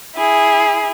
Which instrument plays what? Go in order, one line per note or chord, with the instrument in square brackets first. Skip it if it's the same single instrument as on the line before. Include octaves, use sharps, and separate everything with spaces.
[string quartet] E4 G#4